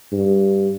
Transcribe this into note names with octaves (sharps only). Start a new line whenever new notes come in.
G2